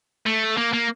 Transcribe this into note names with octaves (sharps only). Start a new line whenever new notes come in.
A3
A#3
A#3